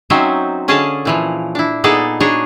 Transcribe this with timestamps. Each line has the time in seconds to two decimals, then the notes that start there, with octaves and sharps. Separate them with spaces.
0.10 F#3 C4 C#4 D#4 C5 E5
0.68 D3 C#4 G#4 D#5 F5 A5
1.05 A#2 E3 F3
1.55 D4 E4
1.84 A#2 B3 D#4 G#4 A4 D5
2.20 D4 D#4 F#4 G#4 C#5 D#5